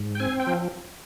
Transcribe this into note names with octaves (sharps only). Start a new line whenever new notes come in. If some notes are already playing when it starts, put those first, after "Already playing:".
Already playing: G#2
G5
C4 G#5
G5
F3